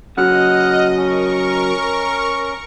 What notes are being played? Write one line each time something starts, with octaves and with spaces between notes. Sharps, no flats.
C#3 F#3 D#5 F#5 F6 F#6
C#4 A#4 C#6